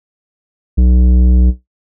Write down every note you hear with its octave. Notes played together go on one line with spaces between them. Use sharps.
B1